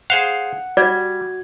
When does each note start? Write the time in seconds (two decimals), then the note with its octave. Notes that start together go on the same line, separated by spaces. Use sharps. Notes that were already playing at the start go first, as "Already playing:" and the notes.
0.10 G#4 C5 F5 F#5
0.77 G3 F#4 D5 G#6